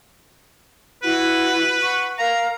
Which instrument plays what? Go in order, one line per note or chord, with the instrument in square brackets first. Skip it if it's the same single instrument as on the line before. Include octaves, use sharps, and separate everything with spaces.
[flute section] E4 F#4 F#5 [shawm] B4
[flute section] F#5 C#6
[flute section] A#4 F5 [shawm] A#5